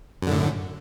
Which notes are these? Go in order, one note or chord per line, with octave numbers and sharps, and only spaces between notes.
F#2 A2 D3